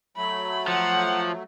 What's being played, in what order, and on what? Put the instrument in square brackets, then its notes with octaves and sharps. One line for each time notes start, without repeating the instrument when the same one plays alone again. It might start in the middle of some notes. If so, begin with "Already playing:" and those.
[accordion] F#3 A3 [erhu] B5
[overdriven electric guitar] F3 [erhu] F#5